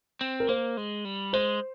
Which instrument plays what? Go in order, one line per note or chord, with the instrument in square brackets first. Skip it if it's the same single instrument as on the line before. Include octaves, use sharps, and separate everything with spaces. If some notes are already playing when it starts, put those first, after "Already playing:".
[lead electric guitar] C4
[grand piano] A#4
[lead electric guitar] A#3 [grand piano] C5
[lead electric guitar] G#3
G3
[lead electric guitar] G#3 [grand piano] C5